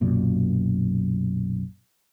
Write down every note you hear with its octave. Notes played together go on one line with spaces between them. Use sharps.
B1 F#2 A#2